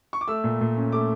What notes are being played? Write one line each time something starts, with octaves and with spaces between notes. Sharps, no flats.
C#6
D6
A3 E6
A#2
A#2
C#4
A3 D6